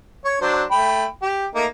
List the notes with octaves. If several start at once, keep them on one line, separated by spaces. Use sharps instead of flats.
C#5
F#3 D4 C5
A3 G5 B5
G4
A3 A#3 D#4